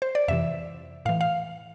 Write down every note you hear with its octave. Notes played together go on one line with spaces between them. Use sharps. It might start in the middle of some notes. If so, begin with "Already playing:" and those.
C5
D5
F2 C3 E3 E5
A2 E3 F5
F5